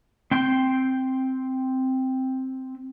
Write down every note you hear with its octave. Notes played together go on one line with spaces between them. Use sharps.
C4 G5 C6